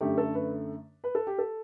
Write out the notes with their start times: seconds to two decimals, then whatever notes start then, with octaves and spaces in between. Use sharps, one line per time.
0.01 F#2 D3 A3 G4
0.18 A4
0.35 B4
1.04 B4
1.15 A4
1.27 G4
1.38 A4